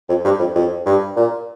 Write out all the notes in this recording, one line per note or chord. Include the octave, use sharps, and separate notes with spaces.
F2
G2
F2
F2
G2
A#2